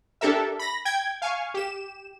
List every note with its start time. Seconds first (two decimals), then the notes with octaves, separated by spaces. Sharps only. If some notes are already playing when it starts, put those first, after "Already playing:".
0.21 D4 G4 A4 A#4 E5
0.59 B5 A#6
0.85 G5 G#6
1.22 F5 G#5 C#6
1.54 G4 E7